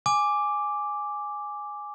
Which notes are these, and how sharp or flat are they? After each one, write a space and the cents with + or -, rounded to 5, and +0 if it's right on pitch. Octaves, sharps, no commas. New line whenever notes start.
G#5 +0 D6 +0